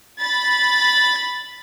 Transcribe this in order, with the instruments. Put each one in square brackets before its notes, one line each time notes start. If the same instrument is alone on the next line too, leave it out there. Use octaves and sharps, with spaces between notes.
[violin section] B5 A6